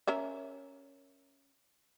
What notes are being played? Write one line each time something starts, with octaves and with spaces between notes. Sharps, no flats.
C#4 A#4 E5